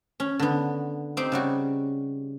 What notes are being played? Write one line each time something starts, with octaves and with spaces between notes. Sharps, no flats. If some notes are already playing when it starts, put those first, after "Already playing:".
C#4
D3 B3
C4 D#4 G4 C5 G5
C#3 G3 F#4